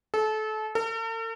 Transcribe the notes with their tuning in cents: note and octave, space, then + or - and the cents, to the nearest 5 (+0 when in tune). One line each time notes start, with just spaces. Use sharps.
A4 -30
A4 +45